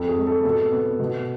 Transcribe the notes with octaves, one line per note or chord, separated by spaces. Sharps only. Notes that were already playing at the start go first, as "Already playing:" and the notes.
Already playing: F2 A4
G#4
G#3
A4
B2 A4
B3
B2